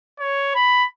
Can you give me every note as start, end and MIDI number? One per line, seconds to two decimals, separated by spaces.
0.20 0.52 73
0.55 0.85 83